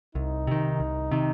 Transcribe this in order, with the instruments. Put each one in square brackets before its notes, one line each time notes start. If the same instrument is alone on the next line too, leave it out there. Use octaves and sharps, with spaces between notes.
[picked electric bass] C2 [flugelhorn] D#4
[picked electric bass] C3 D#3
C2
C3 D#3